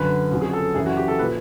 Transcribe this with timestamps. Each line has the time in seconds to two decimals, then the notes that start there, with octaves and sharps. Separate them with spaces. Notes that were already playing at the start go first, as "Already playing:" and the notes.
Already playing: F#2 D3 F#3 B4
0.31 F2 C#3 F#3
0.41 G#4
0.53 A4
0.74 F#2 C#3 E3 G#4
0.86 F#4
0.97 G4
1.08 A4
1.19 A#2 F3 B4